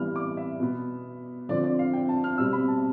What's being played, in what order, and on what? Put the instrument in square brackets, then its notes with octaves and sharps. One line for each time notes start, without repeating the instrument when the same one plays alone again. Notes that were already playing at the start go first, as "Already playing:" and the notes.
Already playing: [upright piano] E3 G3 B3 F6
D6
E5
B2 B3
D3 F3 C4 D5
D5
F5
G5
A5
F6
B2 G3 C4 E6
B5
A5